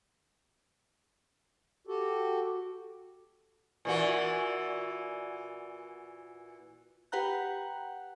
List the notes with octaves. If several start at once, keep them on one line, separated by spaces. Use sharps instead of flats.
F#4 G4 A4
A#2 E3 F#4
G4 B4 F#5 G5 A#5 F#6